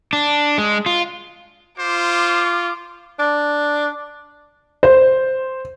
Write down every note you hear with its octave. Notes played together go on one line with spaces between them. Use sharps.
D4
G#3
F4
F4 C5 D6
D4
C5